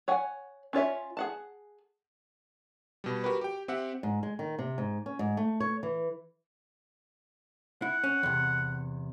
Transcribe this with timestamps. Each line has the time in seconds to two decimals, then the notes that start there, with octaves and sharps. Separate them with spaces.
0.08 C#5 F#5 G#5
0.73 C#4 F4 C#5 E5
1.17 G#4 F#5 A5
3.04 B2 G3
3.24 F#4 G4 A#4 B4
3.41 G4 G5
3.68 C4 G4 E5 F#5
4.03 G#2
4.23 G#3
4.39 D#3
4.59 C3
4.78 G#2
5.06 C#4
5.19 G#2
5.37 A3
5.60 C#5
5.83 E3
7.82 E4 F#5
8.04 C#4
8.23 E2 C3